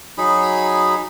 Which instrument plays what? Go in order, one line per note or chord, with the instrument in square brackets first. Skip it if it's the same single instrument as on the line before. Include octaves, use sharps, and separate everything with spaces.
[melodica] F#3 D#4 G#4 B5